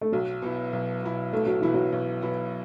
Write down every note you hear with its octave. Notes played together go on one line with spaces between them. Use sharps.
A3
B1 F#3
B2 B3 E4
B1
B2 B3 E4
B1 A3
F#3
B2 E3 B3 E4
F#3
B1
B2 B3 E4